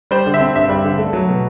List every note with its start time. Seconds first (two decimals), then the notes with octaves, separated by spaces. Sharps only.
0.11 G3 C5
0.26 D3
0.34 E5
0.40 C4
0.56 G2 E5
0.69 G3
0.84 D3
0.99 A3
1.13 F#3
1.28 B2